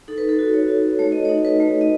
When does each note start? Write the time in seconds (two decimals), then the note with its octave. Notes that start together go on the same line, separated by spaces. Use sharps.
0.08 D#4 A4
0.18 B4
0.29 A4
0.39 F#4
0.54 C#5
0.68 F#4
0.99 A3 C#5
1.12 D#5
1.25 D#4 C#5
1.45 B4
1.60 A3
1.81 D#5